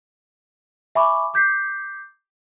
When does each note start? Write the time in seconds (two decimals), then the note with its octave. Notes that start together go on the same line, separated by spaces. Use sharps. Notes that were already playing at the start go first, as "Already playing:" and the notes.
0.95 E5 G#5 B5 C#6 D6
1.34 D6 G6 B6 C7